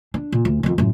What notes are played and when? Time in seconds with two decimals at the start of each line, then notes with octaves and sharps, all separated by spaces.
0.14 D4
0.32 A#2
0.45 D2
0.63 F2 D#3
0.78 F#2 A2